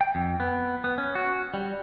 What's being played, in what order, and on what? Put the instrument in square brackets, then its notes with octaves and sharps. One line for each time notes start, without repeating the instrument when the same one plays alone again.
[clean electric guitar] G5
F2
B3
B3
C#4
F#4
G3